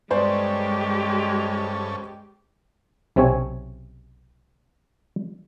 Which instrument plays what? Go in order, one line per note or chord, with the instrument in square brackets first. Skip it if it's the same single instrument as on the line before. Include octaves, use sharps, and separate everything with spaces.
[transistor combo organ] G2 C#4 A4 [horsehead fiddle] G#3 G4 [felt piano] B3 C5 D5
[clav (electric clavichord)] B1 C3 C4 C#4 C#5 G#5